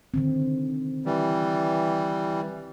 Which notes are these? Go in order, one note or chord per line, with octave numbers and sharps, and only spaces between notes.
D3 D#3 C4
E3 G3